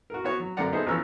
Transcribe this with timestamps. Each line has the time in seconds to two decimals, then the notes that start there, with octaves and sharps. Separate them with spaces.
0.10 F#4 A#4
0.24 B3 F#4 C#5
0.40 F#3
0.57 F#2 D3 A#3 D5 F#5 A#5
0.73 B3 D#4 G#4 A4 C5
0.86 A1 F3 B3 C#4 B4 E6